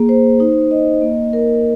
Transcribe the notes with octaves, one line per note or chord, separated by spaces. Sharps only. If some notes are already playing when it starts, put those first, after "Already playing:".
Already playing: A#3 G#4
C5
D#4
D#5
A#3
A#4